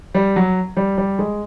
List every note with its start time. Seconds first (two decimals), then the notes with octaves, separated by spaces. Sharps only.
0.15 G3
0.36 F#3
0.77 G3
0.98 G3
1.19 G#3